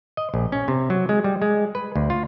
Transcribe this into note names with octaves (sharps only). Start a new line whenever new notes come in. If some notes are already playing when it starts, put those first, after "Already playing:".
D#5
A#1
C#4
C3
F#3
G#3
G3
G#3
B4
D2
F4